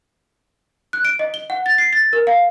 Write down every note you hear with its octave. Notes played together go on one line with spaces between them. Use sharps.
F#6
D7
D#5
G7
F#5
A6
C7
A6
A#4
F5